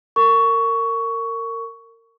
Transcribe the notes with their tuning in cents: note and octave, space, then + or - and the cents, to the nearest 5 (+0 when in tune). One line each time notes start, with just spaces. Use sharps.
A#4 -25 C#6 +15